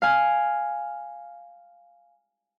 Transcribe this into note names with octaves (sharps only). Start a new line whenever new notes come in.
F5 G#5